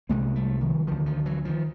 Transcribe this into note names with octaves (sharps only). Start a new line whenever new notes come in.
C2 C3 G#3 A#3
G3 A3
D#3 F3
D2 D3 D#3 F3
D#3 F3
E3 F#3
D#3 F3